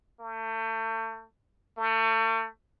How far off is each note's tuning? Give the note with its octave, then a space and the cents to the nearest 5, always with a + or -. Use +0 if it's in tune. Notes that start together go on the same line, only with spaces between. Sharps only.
A3 +35
A3 +35